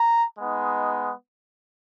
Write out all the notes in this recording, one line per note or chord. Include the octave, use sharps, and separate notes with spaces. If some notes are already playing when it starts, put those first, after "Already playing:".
Already playing: A#5
G#3 B3 D#4